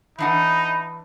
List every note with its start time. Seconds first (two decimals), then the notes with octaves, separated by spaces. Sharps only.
0.19 E3 D4 D#4 E5 F#5 B5